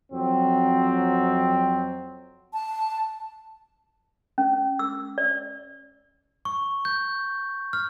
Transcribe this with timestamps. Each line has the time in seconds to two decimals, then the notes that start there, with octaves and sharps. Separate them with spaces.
0.11 F2 F#3 C4
2.53 A5
4.38 C#4
4.79 E6
5.18 D5
6.45 C#6
6.85 G6
7.73 F6